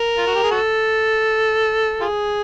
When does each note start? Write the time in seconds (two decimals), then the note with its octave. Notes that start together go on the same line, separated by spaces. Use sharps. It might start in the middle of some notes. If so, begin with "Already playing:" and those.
Already playing: A#4
0.18 F4
0.27 F#4
0.35 G4
0.43 G#4
0.51 F#4 A4
2.01 F4 G#4